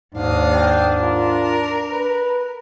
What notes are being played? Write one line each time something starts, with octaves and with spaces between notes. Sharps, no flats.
D#2 G#2 D4 F5 D#6
G5
F4 A#4
B4